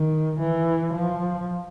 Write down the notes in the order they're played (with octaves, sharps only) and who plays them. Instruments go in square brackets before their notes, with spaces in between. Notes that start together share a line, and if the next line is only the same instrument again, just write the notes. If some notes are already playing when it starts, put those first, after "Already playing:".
Already playing: [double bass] D#3
E3
F3